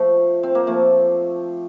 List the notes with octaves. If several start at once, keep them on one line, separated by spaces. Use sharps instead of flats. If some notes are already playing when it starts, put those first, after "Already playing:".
Already playing: F3 A3
C4
A#3
F3 A3